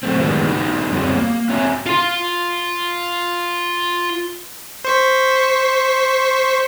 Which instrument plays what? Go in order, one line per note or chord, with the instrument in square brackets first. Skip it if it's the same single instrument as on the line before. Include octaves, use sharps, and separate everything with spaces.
[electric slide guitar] F#3 A3 C4
A2 D#3 E3 G3 G#3 B3
F3 G3 D#4 F#4
F#2 G3 C4 F#4 G#4 C#5
A#3
C4 F#4 C#5 E5 G#5 A#5
[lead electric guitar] F4 C6
[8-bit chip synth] C5 C#6 B6